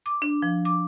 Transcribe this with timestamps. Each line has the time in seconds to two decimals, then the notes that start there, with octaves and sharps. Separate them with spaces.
0.06 D6
0.22 D4
0.42 F3
0.65 D6